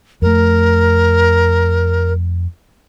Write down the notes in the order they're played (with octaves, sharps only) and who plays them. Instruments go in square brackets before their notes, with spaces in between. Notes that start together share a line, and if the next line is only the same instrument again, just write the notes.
[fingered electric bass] F2 A3 [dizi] A#4